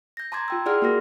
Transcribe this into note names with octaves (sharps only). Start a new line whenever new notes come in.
G6 A#6
A5 A#5 C6 D6 G#6 A6
F4 G5 E6
E4 G#4 D5 F#5 C6 F6
A#3 F#4 A#4 A#6